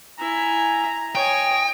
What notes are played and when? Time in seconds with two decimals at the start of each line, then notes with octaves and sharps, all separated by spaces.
0.19 E4 E5 G#5 A#5
1.15 C#5 D#5 G5 G#5